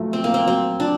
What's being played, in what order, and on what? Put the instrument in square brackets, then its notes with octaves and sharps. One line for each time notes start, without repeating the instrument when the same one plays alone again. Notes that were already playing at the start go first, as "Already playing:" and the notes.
Already playing: [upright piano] A#2 F#3 A3
[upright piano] A#2 [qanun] C4
[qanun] A#3
C4
[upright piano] F#3 [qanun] C4
[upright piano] A#2 [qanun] D4